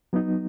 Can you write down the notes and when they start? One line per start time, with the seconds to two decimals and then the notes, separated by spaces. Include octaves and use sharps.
0.13 F#3 B3 D#4